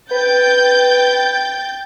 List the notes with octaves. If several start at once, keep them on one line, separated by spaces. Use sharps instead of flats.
B4 G5 G6 A6